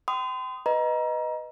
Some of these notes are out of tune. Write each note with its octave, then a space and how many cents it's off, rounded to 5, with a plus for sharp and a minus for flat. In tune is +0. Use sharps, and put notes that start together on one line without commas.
G5 -25 C6 -40 D#6 +0
B4 +0 D#5 +0 A#5 +25